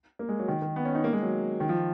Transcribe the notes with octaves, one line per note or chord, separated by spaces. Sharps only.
A#3
G#3
F#3
D#3
D#3
B3
C#4
D#4
A#3
G#3
F#3
D#3
F3